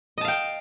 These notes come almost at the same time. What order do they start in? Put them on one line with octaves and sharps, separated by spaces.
D#5 A5 F5 G5